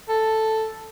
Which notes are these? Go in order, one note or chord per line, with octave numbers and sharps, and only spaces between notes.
A4